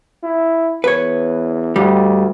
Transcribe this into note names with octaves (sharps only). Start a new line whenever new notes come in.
E4
E2 B4 C#5
D2 G2 G3